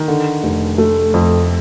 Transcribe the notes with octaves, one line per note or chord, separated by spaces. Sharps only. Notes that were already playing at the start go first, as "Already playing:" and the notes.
Already playing: D#3
D3
F1
A3
F2